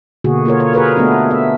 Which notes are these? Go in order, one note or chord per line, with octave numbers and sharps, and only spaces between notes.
B2 D3 A#3 F#4 G#4
A#3 F4 A#4 C#5
C#5
G#4 A#4 B4 C#5
A3 B3 D4 D#4
E5